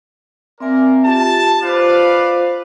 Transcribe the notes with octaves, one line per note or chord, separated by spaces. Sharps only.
A#3 C4 A#4 D5 E5 G#5
F4 G4 A5
F4 B4 C5 D5 F5